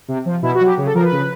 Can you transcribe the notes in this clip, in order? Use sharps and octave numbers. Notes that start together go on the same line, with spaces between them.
C3
F3
B2 E4
F#4
F#3
G4
C#3
A4
F3 A#4
B4
C#3